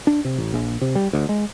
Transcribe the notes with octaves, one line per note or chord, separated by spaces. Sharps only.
D4
C3
A1
A#1
C3
G3
D2
G#3